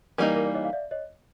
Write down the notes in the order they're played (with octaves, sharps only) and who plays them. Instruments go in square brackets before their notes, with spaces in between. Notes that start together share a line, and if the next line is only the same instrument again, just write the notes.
[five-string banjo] E3 G3 A#3 D#4 [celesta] A#4
[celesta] A#4
D5
C#5 D#5
F5
D5 E5
C#5 D#5